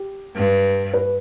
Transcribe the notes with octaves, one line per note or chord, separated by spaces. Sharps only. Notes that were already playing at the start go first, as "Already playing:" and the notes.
Already playing: G4
G2
B4